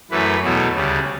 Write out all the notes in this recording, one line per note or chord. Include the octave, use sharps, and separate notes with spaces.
F#2 E3 A3 B4
E2 B2 F#3 A3
D2 C#3 G3